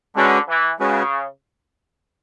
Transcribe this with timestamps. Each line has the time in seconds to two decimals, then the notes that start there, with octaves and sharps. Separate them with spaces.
0.16 D3 G#3 C#4 F#4 B4
0.48 E3
0.80 C#3 G#3 C#4 F#4 B4